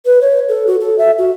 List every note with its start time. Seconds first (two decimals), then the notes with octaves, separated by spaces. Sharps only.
0.06 B4
0.21 C#5
0.49 A4
0.67 F#4
0.81 A4
0.98 E5
1.18 F#4